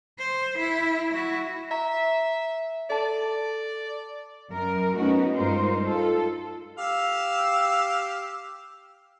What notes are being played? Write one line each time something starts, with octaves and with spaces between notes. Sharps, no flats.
C5
E4
E4 F#4
E5 A#5
A4 D5 A5
F#2 A#4
A3 B3 C#4 D#4 F#4
G2 G#3 D#4 F4 A#4 C5
F4 A4
G4 F5 E6